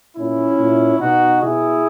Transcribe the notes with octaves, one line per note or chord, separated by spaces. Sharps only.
A#2 C#4 E4
A#2
B2 D#4 F#4
B2 E4 G#4